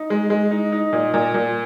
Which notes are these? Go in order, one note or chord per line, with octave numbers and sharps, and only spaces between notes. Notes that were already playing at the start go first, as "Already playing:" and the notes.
Already playing: D#4
G#3
G#3
D#4
D#4
A#2
A#2
A#2